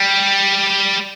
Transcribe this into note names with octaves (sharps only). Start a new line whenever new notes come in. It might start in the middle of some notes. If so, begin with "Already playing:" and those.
Already playing: G3